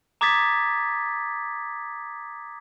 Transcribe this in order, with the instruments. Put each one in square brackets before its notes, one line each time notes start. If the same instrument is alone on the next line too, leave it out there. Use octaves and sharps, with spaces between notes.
[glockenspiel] A#5 D6 D#6 G#6 A6 B6